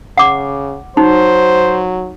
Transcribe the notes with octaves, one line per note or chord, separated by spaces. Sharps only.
C#3 F#5 D6
F#3 D#4 C5